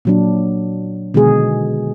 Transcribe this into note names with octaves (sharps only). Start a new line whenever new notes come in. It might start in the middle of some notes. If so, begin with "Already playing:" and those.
A#2 F#3 D4
B2 D3 D#3 G#3 G#4